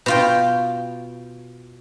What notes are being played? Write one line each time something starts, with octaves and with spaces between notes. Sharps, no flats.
B2 F4 G5